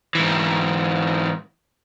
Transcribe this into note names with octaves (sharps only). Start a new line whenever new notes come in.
G#2 E3